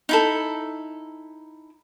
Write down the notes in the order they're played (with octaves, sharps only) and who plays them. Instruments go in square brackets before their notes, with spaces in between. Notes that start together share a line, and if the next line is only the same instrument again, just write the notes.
[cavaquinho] D#4 E4 A4